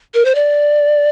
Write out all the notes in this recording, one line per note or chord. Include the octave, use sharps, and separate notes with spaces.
A#4
C5
D5